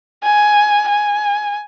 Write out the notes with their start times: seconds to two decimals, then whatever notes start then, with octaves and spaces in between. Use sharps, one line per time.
0.24 G#5
0.89 G#5